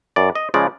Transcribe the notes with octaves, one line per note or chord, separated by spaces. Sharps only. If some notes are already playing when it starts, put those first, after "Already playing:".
F#2 D5
D#5
C#3 F3 G#3 D5